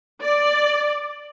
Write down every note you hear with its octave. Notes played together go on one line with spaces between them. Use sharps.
D5